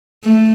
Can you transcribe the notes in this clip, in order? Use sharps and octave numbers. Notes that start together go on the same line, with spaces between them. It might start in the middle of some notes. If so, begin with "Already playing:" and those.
A3